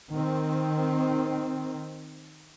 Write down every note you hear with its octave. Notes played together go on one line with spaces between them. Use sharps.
D#3 C4